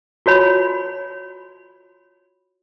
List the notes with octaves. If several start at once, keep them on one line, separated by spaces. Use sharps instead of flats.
F4 F#4 C#5 B5